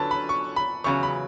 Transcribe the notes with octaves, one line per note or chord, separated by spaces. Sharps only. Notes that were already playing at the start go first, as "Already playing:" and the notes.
Already playing: D3 F#3 C#4 B4 A5
B5
C#6
B5
E2 C#3 F#3 C#6
B5